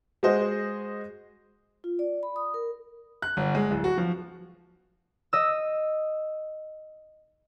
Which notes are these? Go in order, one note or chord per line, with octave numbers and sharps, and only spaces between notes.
G#3 F#4 G#4 C5 D#5
F4
D5
B5
D#6
A#4
F#6
G1
G#3
D1
F#4
F3
D#5 E6